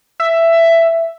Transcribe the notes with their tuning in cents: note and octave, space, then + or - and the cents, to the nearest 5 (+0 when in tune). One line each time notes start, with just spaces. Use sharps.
E5 +10